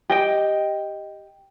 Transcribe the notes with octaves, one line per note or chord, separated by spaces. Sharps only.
G4 D#5 G5